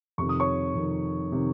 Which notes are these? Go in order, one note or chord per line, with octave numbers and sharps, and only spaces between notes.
F2 C3 D#3 C#6
D#6
C#5 C#6
F2 C3 D#3
C3 D#3